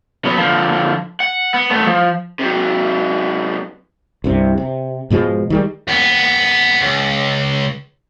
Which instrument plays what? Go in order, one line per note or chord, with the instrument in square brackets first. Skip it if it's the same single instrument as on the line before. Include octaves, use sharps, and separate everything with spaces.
[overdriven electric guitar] F#3 B3
D3 F3
F#5
B3
A3 B3
F3
[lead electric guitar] C3 F#3
[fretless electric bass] C2 G2 C3
C3
G#2 B2 F3 G#3
D#3 G3 G#3
[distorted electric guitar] D#2 B3
C#2